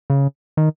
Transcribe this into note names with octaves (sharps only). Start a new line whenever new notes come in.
C#3
D#3